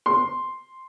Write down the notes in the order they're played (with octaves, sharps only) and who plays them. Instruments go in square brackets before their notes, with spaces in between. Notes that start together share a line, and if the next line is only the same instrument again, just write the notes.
[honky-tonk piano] C6